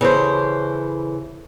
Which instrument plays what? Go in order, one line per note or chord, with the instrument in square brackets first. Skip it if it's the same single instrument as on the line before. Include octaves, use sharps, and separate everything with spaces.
[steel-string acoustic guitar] C#3 E3 A4 C5